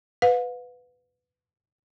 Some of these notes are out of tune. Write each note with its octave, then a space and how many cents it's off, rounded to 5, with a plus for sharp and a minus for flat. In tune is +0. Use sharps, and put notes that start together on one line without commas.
B4 +15 F5 +40